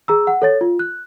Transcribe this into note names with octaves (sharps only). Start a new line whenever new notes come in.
G#4 A#5 E6
F#5
A4 C#5 A6
F4
F#6